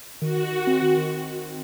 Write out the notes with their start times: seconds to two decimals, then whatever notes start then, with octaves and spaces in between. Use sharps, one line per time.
0.21 D#3 F#4
0.37 D#3
0.52 D#3
0.67 C4
0.82 D#3
0.97 D#3